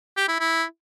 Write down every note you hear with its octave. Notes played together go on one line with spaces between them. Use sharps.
G4
E4
E4